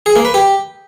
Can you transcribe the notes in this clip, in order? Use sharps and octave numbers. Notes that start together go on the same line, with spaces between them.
G#4
A#3
B4
G4